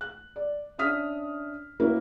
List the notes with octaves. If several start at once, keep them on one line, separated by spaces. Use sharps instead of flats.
F#6
D5
C#4 D4 E5 D#6 F6 B6
A#3 C#4 E4 F#4 A#4 B4